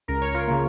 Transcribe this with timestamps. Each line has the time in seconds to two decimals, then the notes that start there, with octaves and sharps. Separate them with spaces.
0.08 C#2 A#4
0.21 C#5
0.34 F4 A#4
0.47 C#3 A#3